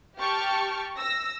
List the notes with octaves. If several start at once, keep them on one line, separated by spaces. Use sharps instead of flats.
G4 G5 A5 C#6 F6
E6 A#6